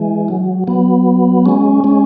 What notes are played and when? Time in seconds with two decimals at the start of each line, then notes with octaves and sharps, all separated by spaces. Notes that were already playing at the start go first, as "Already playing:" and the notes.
Already playing: E3 G#3
0.28 F#3
0.67 F#3 B3
1.45 G#3 C#4
1.84 G#3 C#4